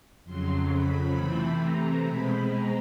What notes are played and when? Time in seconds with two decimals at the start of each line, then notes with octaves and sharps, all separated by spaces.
0.24 F2 C#3 F#3 C6
0.70 B5
1.15 C3 E3 A3 C4
1.59 A#5
2.05 B2 G#3 C4 B5
2.50 A#5